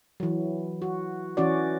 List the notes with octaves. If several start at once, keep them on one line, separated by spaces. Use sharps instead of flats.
E3 F#3
F#4
E3 C#4 F#4 D5